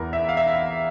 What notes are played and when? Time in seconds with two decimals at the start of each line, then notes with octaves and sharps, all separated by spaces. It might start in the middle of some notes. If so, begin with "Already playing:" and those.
Already playing: E2 E3 A#4
0.13 E5
0.29 F5
0.37 E5
0.47 F5